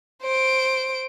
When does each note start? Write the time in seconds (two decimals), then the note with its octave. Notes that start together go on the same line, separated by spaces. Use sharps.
0.23 C5 D7